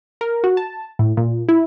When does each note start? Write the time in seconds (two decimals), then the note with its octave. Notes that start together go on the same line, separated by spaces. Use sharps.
0.21 A#4
0.44 F#4
0.57 A5
0.99 A2
1.17 A#2
1.49 E4